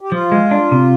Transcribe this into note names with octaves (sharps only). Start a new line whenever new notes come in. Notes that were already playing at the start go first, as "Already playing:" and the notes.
G4
F3 F4
G#3
D4
C3